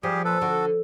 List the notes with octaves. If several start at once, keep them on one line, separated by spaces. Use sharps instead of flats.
F3 G3 G4 G#4
A#2 A4 B4
D3 F#4